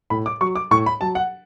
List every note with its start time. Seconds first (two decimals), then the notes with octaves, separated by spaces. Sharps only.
0.10 A2 B5
0.26 D6
0.41 F#3 C#6
0.55 D6
0.71 A2 C#6
0.86 B5
1.01 F#3 A5
1.15 F#5